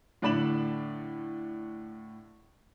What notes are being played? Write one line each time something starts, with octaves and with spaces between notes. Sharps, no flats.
A2 D3 D5 B5 E7 F#7